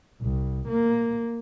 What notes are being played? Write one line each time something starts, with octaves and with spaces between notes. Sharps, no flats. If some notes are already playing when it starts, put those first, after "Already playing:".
C2
A#3